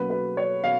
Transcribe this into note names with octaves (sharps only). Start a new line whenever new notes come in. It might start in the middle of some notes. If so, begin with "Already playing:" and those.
Already playing: B2 F#3 A#3 C#4 B4
B4
C#5
B2 F5